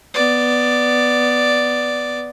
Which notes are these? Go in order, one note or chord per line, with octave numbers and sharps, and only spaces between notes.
B3 D5